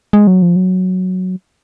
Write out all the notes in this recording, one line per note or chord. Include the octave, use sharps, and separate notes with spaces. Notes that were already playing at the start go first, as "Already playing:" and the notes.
G#3
F#3
F3
F#3